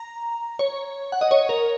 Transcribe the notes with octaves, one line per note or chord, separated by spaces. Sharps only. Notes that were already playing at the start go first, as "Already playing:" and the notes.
Already playing: A#5
C#5
F#5
D#5
C#5
A#4